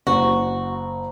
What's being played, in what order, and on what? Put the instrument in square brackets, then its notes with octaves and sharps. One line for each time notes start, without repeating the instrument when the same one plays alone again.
[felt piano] F#1 [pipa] F#4